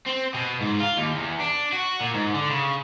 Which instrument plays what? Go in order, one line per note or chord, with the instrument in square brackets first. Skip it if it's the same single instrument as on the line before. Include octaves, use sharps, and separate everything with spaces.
[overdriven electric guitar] C4
B2
G#2
F4
D#2
E2
D4
F#4
A#2
G#2
D3
C#3